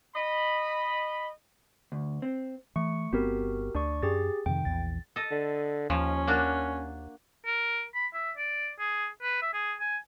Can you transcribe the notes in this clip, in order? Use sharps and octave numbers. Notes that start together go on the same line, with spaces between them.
D#5 B5
D2
C4
E3 A3 C#6 C#7
G1 B3 C4 F#4 G4 A#4
D2 D4 D5 C#6
F#2 G4 G#4 A6
F2 C3 D#3 G5
A#1 E2 A6
A4 D#5
D3
D#2 F3 C#4
A#3 D4 F#4
A#4
B5
E5
D5
G#4
B4
E5
G#4
G#5